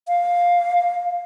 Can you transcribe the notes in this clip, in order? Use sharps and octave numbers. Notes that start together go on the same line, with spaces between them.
F5